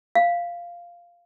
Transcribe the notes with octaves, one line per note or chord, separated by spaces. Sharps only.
F5